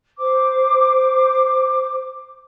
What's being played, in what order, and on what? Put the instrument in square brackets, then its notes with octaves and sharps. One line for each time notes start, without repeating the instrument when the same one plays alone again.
[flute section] C5 D6